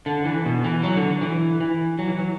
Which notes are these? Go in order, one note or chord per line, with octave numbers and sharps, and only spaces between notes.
D3
E3
B2
E3
F#3
D3
E3
E3
F#3
E3
F#3